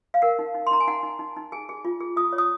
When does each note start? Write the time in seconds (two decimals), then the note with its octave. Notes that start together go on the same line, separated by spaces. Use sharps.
0.14 F5
0.22 A#4 F#5
0.39 D#4
0.54 D#4
0.67 C6
0.71 D#4 A#5
0.80 G#5
0.87 D#4 F#5
1.03 D#4
1.19 D#4
1.37 D#4
1.52 G#4 G#5
1.69 G#4
1.85 F4
2.00 G#4
2.17 F4 D#6
2.33 C#5
2.38 D#6